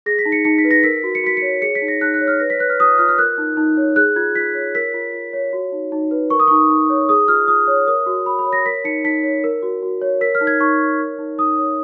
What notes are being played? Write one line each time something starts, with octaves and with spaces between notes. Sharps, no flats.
G#4 A#6
B6
D#4
C#7
D#4 C#7
B6
B4
A#6
A#4 B6
F#4
C#7
F#4 B6
C#7
C#5
G#4 C#7
B6
D#4
A#6
D#4 F#6
F#6
C#5
F6
B4 A#6
B6
B4 F#6
F6
F4 D#6
F4 F6
F6
A#4 F#6
D#4
D#4
C#5
G#4 F#6
F4 G#6
F4 B6
C#5
A#4 B6
F4
F4
C#5
F#4
D#4
D#4
B4
A#4 C#6
D#6
D#4 C#6
D#4
C#5
G#4 D#6
F4 F6
F4 D#6
C#5
A#4 D#6
F#4
F#4 B5
B5
C#5
A#6
A#4 B6
D#4 C#7
D#4 B6
C#5
A#4
F#4
F#4
C#5
A#4 B6
F6
D#4
G#6
D#4 C#6
C#5
A#4
D#4
D#4 D#6
C#5